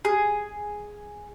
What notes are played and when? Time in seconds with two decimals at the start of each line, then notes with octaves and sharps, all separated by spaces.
0.05 G#4